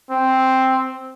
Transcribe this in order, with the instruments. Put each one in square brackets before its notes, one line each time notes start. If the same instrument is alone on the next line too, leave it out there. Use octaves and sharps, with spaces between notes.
[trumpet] C4